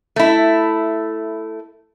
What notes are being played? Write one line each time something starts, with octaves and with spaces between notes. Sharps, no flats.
A3 E4